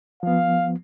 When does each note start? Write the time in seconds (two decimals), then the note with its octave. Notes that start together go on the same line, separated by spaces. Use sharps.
0.23 F3 B3 F5